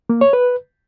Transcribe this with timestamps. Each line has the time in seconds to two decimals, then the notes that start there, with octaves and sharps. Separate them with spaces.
0.09 A#3
0.21 C#5
0.33 B4